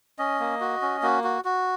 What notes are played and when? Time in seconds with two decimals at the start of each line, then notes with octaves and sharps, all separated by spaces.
0.18 C#4 D#5
0.40 A#3
0.61 F#4
0.82 C#4
1.02 A#3 F#4
1.24 F#4
1.45 F#4